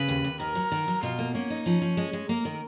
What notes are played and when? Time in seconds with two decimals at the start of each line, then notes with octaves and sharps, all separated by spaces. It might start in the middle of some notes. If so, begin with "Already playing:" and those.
Already playing: C#3 B4
0.08 D#2
0.24 D#2
0.40 D#3 A#4
0.55 F#3
0.72 D#3
0.88 F#3
1.03 B2 F4
1.19 A#3
1.34 A#3 C#4
1.50 D#4
1.66 F3 C#4
1.82 F3
1.97 G#3
2.13 G#3
2.29 A#3 A#4
2.45 D#3